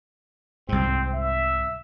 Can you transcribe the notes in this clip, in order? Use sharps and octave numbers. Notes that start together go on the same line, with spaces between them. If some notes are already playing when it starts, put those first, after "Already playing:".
C2 G#2 C4
E5